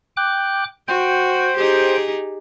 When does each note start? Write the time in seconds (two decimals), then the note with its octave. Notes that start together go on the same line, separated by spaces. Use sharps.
0.17 G5 D6 F#6
0.88 F#4 C5 G5
1.56 D#4 G4 G#4